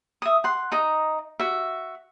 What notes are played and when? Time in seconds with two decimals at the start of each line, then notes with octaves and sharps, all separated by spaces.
0.22 E5 D#6
0.44 F#5 C6
0.72 D#4 D#5 A#5
1.40 F#4 E5